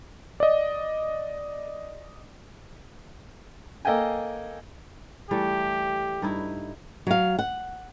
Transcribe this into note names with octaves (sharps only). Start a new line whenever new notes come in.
D5 D#5
A#3 A4 D#5 F5 G5 G#5
E3 G3 A3 G4
G2 D#4 E4
F#3 F5
F#5